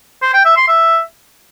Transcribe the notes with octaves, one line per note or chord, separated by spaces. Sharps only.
C5
G5
E5
C6
E5